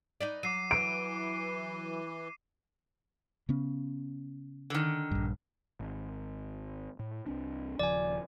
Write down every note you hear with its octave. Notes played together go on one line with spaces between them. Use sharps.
D#4 B4 D5
F#3 D6 C7 D#7
E3 D7
C#3 B3 C#4
D3 D#3
A#1 G2
G#1
A2
C2 C4 D4
D#1 C#3 F3 D5 G#5